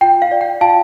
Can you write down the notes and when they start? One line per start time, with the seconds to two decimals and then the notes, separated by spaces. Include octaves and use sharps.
0.01 F4 G5
0.22 F5
0.31 D5
0.41 G5
0.61 F4 F5 A5